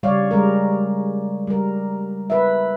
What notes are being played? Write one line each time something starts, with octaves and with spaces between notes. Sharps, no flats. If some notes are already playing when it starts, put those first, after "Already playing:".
C#3 G3 C#5 D5 F5
G3 G#3 A#4
G3 A#4
B4 E5